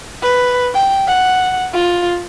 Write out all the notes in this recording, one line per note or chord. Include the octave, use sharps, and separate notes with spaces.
B4
G5
F#5
F4